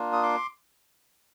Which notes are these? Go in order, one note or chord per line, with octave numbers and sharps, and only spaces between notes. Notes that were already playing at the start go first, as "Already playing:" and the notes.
Already playing: A#3 D4 F4
D#6
C6 D6